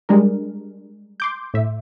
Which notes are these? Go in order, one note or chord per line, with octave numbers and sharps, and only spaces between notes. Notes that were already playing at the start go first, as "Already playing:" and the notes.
G3 G#3 D4 A#4
C6 D6 G6
A2 E5